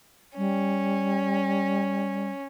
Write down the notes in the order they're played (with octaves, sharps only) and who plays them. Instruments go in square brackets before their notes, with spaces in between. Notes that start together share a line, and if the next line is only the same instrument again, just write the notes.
[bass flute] G3 [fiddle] C#4